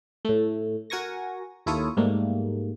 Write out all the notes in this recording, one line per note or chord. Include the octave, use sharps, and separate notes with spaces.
A2 A3
F#4 A#4 G#5 C#6 A#6
D#2 E4 F4 A4 C#5 D#6
G#2 G3 A3 A#3